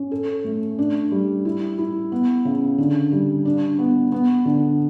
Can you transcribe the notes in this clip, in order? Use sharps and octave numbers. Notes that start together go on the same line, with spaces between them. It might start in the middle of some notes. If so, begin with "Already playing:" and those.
Already playing: C#4
A4
A3
D4
G3
E4
E4
B3
C#3
D3
G3
D4
B3
B3
D3